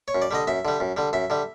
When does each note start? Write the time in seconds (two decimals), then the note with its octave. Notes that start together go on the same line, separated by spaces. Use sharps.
0.08 C#5
0.15 F#2
0.22 D5
0.31 D3 G3 D#5
0.47 F#2 E5
0.65 D3 G3
0.80 F#2
0.97 D3 G3
1.13 F#2 E5
1.30 D3 G3